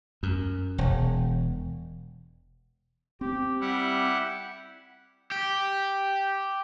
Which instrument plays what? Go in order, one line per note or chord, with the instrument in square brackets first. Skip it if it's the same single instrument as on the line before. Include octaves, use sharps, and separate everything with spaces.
[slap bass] F#2
E1
[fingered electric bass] C4 [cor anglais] G4
[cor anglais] G3 [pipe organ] E4 G4 F#5
[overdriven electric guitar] G4